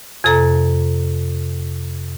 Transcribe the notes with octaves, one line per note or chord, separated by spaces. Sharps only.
F2 C3 A4 A#5